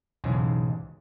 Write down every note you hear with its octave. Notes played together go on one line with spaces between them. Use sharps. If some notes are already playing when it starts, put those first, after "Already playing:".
B1 E2 G#2 C#3 G#3